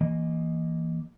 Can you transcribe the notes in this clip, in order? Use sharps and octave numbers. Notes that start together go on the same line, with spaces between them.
E3 A#3 D#5